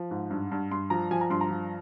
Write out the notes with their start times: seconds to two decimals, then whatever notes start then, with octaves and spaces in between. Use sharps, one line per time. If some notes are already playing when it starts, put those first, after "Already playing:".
Already playing: F3
0.11 G#2
0.31 G2
0.52 G2
0.71 G2 C6
0.90 F3 A#5
1.11 F3 G#5
1.21 A#5
1.30 G2 C6
1.41 A#5
1.51 F3